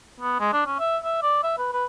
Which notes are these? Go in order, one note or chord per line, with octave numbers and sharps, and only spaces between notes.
B3
G#3
D4
C#4
E5
E5
D5
E5
B4
B4